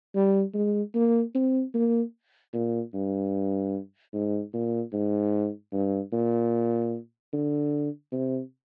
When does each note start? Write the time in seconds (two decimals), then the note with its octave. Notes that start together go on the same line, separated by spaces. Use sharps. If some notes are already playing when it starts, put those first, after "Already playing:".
0.15 G3
0.54 G#3
0.94 A#3
1.35 C4
1.74 A#3
2.53 A#2
2.94 G2
4.14 G#2
4.54 A#2
4.93 G#2
5.72 G2
6.13 A#2
7.33 D3
8.12 C3